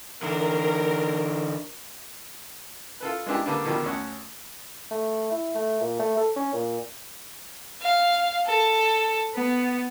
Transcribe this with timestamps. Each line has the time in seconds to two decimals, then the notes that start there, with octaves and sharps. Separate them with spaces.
0.23 D3 E3 A#4
3.00 F4 A4 B4
3.26 G#3 B3 D4 E4 G4
3.46 D3 G3 A#3 B3 D4
3.65 B2 D3 D#3 F3 G3
3.84 D2 C#4 F#5
4.91 A3
5.31 E4
5.55 A3
5.81 A#2
6.00 A3
6.17 A4
6.36 C#4
6.53 A#2
7.81 F5
8.45 A4
9.35 B3